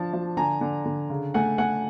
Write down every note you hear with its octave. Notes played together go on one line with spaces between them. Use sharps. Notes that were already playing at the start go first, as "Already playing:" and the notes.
Already playing: F3 D4 A5
F3
D3 G#5 A#5
D3
D3
C#3
A3 F#5 G#5
A3 F#5 G#5